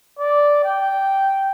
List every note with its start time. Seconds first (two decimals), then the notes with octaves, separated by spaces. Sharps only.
0.19 D5
0.65 G5